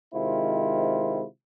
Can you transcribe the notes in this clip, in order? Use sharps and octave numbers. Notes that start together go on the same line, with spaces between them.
C3 D#3 G#3 E4 F4 C5